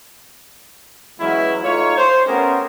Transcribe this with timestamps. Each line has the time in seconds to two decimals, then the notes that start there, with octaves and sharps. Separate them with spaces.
1.20 E3 F#3 G#3 B3 C#4 E4
1.63 A3 D#4 F4 C#5
1.97 C5
2.26 A3 B3 C#4 G4 G#4 A#4